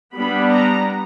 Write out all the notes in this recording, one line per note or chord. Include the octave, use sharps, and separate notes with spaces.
G3 B3 D4 B5
A#5